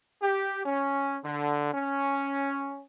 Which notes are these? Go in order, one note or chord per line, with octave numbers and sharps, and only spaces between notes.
G4
C#4
D3
C#4